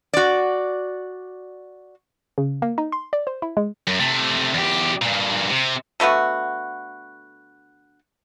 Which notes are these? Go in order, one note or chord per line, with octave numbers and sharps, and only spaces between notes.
F#4 D5
C#3
A#3
D#4
C6
D5
C5
E4
G#3
F#2
C3 A3
E2 G4
G2 A#2
C3
D3 A3 B3 F#4